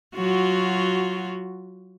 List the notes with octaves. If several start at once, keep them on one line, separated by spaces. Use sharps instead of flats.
F#3 F4 F#4